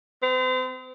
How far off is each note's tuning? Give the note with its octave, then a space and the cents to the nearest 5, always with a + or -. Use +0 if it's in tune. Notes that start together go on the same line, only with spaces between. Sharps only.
C4 -40